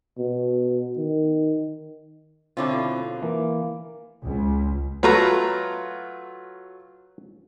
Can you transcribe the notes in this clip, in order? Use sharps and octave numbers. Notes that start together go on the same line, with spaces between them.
B2
D#3
B2 D3 C4 E4 F4 C#5
E3 A#3
C#2
F#3 A3 F4 B4 A#5